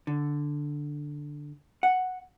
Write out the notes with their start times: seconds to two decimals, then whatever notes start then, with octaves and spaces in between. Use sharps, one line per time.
0.07 D3
1.83 F#5